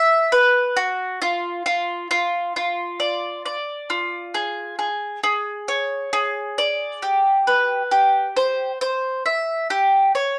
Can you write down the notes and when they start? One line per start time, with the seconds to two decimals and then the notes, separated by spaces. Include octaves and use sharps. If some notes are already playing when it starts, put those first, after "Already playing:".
Already playing: E5
0.32 B4
0.77 F#4
1.22 F4
1.66 F4
2.11 F4
2.56 F4
3.00 D5
3.46 D5
3.90 F4
4.34 G#4
4.79 G#4
5.23 G#4
5.68 C#5
6.13 G#4
6.58 D5
7.02 G4
7.47 B4
7.91 G4
8.37 C5
8.81 C5
9.26 E5
9.70 G4
10.15 C#5